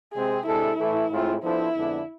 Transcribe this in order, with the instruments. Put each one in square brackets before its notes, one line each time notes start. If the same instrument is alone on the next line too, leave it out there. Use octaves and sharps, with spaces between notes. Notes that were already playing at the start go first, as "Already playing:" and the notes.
[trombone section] C3 G#3 C4 [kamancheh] G#4
[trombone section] C3 G#3 D4 A4 [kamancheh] E4
[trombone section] A2 E3 A3
A2 G#3 C4 F4
[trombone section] F3 B3 D4 A4 C5 [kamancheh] E4
[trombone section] F2 D3 G#3 B3 D4